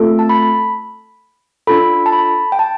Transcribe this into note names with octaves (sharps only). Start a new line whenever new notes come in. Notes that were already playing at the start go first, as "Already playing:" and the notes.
Already playing: A3 C4 F4 A4
A5
B5
D4 F4 A4 B5
A5
B5
G5
A5